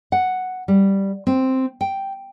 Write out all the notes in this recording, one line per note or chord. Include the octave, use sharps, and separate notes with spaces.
F#5
G3
C4
G5